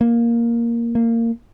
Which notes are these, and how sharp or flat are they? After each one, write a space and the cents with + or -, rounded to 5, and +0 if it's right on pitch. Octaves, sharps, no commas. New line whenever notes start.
A#3 +5
A#3 -20